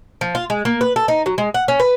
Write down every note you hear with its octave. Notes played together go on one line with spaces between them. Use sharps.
F3
F4
G#3
A#3
B4
A4
D#4
F#3
G#3
F#5
C#4
B4